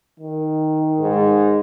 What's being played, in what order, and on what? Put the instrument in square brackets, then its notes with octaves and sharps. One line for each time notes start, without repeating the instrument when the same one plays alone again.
[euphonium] D#3
[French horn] G#2